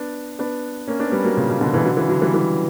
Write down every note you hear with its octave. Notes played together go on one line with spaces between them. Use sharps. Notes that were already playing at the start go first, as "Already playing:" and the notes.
Already playing: B3 D4
B3 D4
A#3 C#4
B3 D4
G3 B3
F#3 A#3
A#2 C#3
B2
B2 D3
C#3 E3
D3 F#3
C#3 E3
D3 F#3
E3 G3
E3 G3